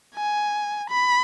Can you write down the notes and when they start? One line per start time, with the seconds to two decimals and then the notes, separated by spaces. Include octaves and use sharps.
0.15 G#5
0.89 B5